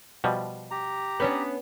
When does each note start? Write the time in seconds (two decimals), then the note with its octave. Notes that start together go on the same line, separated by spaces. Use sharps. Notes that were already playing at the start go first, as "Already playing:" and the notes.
0.24 B2 F3 G3
0.71 G4 A#5
1.20 B3 C#4 D4